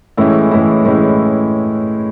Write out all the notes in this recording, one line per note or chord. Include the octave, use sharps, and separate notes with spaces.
A2 E3 G#3 C#4 E4
A2 E3 G#3 C#4 E4
A2 E3 G#3 C#4 E4